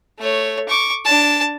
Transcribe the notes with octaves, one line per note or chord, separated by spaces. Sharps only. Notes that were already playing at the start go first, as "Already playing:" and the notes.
A3 C#5
C#6 D6
D4 A5